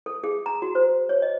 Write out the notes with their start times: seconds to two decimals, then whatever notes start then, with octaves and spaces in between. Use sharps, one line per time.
0.06 A4
0.24 G#4
0.46 A#5
0.62 F#4
0.75 C5
1.09 C#5
1.22 D#5